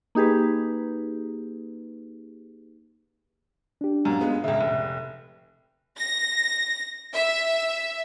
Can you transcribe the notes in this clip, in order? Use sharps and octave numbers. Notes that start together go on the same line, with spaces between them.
A#3 D#4 G4 G#4 B4
D4 G4
F#2 A#3
G#3 B3 F4
C#2 C#3 E5
F1
A#6
E5